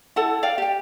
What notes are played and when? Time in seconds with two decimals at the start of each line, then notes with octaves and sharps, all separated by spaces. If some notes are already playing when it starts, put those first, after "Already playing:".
0.16 E4 A4 F#5 A5
0.43 D5 F5 G5
0.58 G4 G5